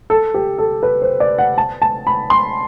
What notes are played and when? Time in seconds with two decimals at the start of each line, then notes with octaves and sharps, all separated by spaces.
0.10 A4
0.34 G4
0.58 A4
0.83 B4
1.02 C5
1.20 D5
1.38 F#5
1.58 A5
1.82 A5
2.07 B5
2.30 C6